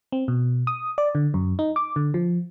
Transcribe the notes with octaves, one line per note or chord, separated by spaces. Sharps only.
C4
B2
D#6
D5
D3
F#2
D#4
D6
D3
F3